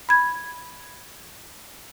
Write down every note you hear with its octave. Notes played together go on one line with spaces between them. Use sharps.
B5 G#6